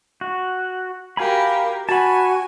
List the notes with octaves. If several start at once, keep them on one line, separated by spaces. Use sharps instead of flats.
F#4
F#4 G4 A#4 F5 G#5 B5
F#4 G#5 A5 B5